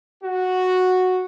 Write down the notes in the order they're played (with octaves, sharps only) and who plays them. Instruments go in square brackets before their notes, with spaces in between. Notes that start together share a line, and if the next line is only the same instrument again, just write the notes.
[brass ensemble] F#4